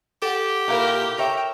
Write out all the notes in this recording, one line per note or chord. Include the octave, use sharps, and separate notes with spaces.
G4 A4 F#5
A#2 E4 A#4 F5
A#4 C#5 E5 G5